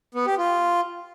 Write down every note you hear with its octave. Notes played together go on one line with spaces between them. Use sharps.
B3
G4
F4